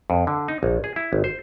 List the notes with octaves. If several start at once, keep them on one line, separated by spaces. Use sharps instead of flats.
F2
D3
D#4
A#1
G#4
E4
G#1
C5